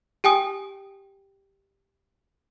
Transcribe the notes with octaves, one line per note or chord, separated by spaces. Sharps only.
G4 G5 G#5 D#6